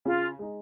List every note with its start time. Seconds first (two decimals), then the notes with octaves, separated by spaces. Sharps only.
0.05 C#3 F4
0.39 G#3 D#4